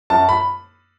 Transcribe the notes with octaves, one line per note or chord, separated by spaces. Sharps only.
F#2 A5
B5